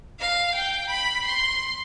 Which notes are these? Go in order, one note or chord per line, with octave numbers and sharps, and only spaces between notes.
F5
G5
B5
C6